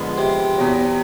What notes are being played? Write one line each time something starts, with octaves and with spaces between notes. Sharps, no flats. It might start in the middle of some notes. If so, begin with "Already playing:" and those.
Already playing: D3 F3 G#3 B3
C3
E2 B2 F#3